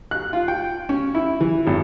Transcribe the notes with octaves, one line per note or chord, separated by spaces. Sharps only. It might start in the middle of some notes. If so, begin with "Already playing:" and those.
F#6
F4
G5
C#4
E4
E3
G#1